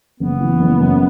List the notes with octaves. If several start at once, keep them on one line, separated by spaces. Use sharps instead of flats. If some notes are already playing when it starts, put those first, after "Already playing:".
F#1 B3
E3
F#1
F#2